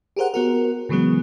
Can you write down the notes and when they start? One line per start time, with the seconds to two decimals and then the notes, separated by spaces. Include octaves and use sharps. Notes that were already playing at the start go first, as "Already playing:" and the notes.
0.16 G4 G#4 A#4 C5 F#5
0.34 B3 F#4 A#4
0.89 C#3 E3 F#3 G#3 B3